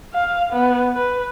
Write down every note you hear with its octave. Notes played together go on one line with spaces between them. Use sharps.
F5
B3
B4